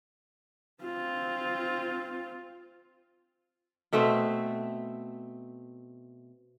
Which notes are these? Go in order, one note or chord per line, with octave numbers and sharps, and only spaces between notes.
C4 F4
B2 A3 C4 E5